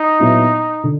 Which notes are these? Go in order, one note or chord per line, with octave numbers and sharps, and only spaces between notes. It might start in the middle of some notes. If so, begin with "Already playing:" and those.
Already playing: D#4
A#2 F#3 B3 E4
D3